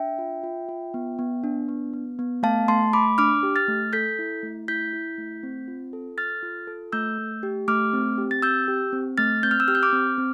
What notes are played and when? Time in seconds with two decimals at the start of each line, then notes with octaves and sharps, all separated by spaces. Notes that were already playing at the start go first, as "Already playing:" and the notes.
Already playing: D4 E5 G5
0.19 F4
0.44 F4
0.69 F4
0.94 B3
1.19 B3
1.44 D4
1.69 B3
1.93 B3
2.19 B3
2.43 A3 F5 A5
2.68 A3 A5 C6
2.93 A3 B5 D6
3.18 D4 D6 F6
3.43 G4
3.56 F6 A6
3.68 A3
3.93 A4 G6 B6
4.19 E4
4.43 A3
4.68 E4 G6 B6
4.93 E4
5.18 A3
5.43 C4
5.68 F4
5.93 A4
6.18 A4 F6 A6
6.43 F4
6.67 A4
6.92 A3 E6 G6
7.18 A3
7.43 G4
7.68 A3 D6 F6
7.93 C4
8.18 G4
8.31 A6
8.42 C4 E6 G6
8.68 G4
8.93 C4
9.18 A3 F6 A6
9.43 C4 G6
9.51 F6
9.60 E6 G6
9.68 G4 F6
9.75 G6
9.83 D6 F6
9.93 C4
10.18 C4